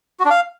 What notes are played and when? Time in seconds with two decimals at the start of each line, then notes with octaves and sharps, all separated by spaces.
0.20 F#4
0.25 D4
0.30 F5